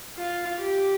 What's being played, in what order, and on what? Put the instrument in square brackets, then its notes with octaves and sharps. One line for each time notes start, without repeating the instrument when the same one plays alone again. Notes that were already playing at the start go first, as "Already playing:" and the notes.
[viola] F4
G4